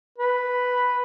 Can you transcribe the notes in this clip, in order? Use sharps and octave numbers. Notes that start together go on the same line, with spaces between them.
B4